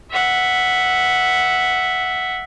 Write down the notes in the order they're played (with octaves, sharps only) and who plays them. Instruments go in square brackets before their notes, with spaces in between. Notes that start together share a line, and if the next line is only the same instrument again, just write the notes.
[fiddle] E5 F#5